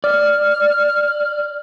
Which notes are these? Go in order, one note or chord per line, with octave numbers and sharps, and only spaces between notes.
D5 F6